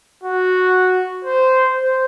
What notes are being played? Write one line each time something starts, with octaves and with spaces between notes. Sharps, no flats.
F#4
C5
C5